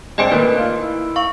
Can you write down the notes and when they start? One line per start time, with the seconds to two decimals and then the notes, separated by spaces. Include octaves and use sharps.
0.18 G#3 C4 D4 C5 D#5 G#5 D7
0.31 A#2 D#3 A3 B4
0.57 F4
0.75 E4
1.16 F5 C#6